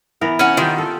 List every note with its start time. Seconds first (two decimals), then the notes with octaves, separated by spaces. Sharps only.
0.21 E3 B3 A#4
0.39 C#4 F#5
0.57 D#3 F4 G4
0.78 A4